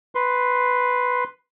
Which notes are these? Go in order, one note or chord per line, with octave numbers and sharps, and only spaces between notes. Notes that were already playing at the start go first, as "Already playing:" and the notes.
B4 C6